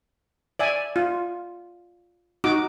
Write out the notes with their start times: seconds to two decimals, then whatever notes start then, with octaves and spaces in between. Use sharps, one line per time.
0.59 D5 E5 G#5
0.96 F4
2.44 D#4 F#4 D6